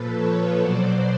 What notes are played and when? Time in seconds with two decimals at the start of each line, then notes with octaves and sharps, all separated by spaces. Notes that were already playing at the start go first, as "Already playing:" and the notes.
Already playing: A#2 F3 A4 B4
0.14 B4 C#5
0.59 B2 F#3 C5 D5